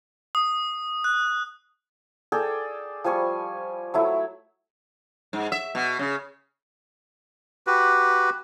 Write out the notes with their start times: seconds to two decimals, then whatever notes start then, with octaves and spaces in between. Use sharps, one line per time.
0.35 D#6
1.04 F#6
2.32 G#4 A4 D5 G5
3.04 F3 G3 G#5 C#6
3.94 F#3 A3 E4
5.33 G#2
5.52 E5
5.75 B2
5.99 C#3
7.67 F#4 G4 B4